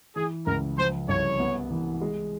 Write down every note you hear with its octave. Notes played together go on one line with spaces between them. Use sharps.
E3 G#4
C#2 A#4
F3 C5
C2 C#5
B3
E3
G#3